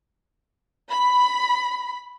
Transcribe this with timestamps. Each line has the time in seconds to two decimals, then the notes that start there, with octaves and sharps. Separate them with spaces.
0.89 B5